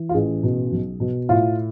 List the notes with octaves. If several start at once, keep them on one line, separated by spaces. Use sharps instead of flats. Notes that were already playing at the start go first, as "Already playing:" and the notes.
Already playing: E3
F4
A1 G#4
B2
B1
B2
A2 F4